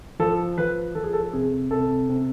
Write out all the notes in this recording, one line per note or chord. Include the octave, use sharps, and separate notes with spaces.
F3 A4
F3 B4
F3 A4
G#4
A4
C3 G#4
C3 A4
C3